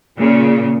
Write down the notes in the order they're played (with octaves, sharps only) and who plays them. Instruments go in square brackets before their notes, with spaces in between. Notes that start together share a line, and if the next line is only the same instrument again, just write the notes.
[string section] A#2 C#3